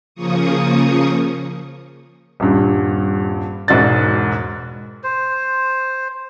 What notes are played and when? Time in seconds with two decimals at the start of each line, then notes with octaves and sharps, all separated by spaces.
0.15 C#3 F3 A#3 C#6 D#6
2.40 D#1 G2
3.68 E1 G#2 F#4 D5 A6
5.04 C5